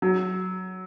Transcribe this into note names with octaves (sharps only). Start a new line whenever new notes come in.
F#3